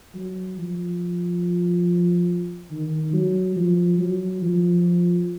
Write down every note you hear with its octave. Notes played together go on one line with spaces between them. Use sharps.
F#3
F3
D#3
F#3
F3
F#3
F3